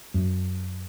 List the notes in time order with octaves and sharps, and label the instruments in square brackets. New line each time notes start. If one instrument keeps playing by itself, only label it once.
[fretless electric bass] F#2